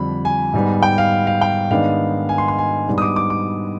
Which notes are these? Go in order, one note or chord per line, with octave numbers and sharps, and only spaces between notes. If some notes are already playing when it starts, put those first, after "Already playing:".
Already playing: F2 D3 G3 D4 B5
G#5
G#2 G3 B3
G5
F5
F5
G5
G#2 D#3 G#3 B3 D4 F5
G#5
C6
C6
G#5
G#2 G3 B3 D4
D#6
D6
D6
D6